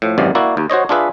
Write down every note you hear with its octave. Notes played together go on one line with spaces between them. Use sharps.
A2 F3
G#1 F#2 C3 E3 D5
A#3 E4 F#4 D5
D#2
F#4 C5 C#5 D#5
D4 F4 G#4 B4 E5